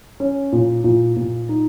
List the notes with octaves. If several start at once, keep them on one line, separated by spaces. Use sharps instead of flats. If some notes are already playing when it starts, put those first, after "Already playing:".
C#4
A#2
A#2
A#2
D#4